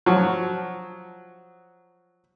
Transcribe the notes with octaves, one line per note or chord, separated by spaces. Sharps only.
F3 F#3